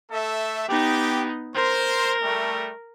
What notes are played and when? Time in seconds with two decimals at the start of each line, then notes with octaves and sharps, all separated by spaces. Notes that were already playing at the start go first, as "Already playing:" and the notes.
0.11 A3 A4 E5
0.69 B3 D#4 G4
1.54 A#4 C5
2.22 G3 A3